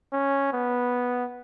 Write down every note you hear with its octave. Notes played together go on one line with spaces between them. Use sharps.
C#4
B3